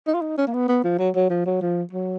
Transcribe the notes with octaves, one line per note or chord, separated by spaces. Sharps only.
D#4
F4
D#4
C#4
A#3
B3
B3
F3
F#3
F#3
F3
F#3
F3
F#3